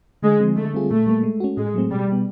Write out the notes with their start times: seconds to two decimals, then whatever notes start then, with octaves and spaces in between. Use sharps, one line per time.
0.22 D3 G#3
0.40 F3 G#3 C4
0.56 D3 A3
0.74 G3 C4 F4 G#4
0.90 A#2 A3
1.07 G3 A#3
1.23 G#3
1.40 C#4 F#4
1.57 A2 G#3
1.74 F#3 A3 C4
1.91 B2 G3
2.08 G3 B3